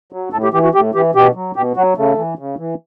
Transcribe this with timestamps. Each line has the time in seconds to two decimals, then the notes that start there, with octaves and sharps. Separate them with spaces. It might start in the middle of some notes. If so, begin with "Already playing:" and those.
0.13 F#3
0.33 A2 A4
0.44 G4
0.54 E3 G4
0.63 F#4
0.74 A2 G4
0.95 E3 G4
1.15 B2 G4
1.35 F#3
1.56 B2 G4
1.76 F#3 F#4
1.97 C#3 A3
2.18 E3
2.39 C#3
2.58 E3